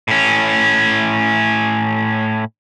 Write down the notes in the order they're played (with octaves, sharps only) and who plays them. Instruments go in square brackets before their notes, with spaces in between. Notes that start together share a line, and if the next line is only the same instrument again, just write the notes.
[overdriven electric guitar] A2 C#4